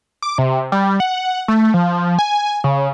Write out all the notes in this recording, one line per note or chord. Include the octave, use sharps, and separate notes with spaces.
D6
C3
G3
F#5
A3
F3
G#5
C#3